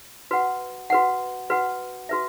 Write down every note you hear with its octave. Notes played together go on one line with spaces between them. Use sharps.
F#4 B4 F#5
F#4 B4 F#5
F#4 B4 F#5
F#4 B4 E5